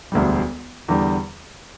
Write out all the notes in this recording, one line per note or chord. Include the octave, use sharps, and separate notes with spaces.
E1 D2 D3 G3
E2 D3 G3